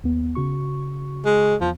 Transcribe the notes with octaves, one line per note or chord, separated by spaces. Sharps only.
D#2 B3
C#3 F#4 C#6
G#3
E2 F3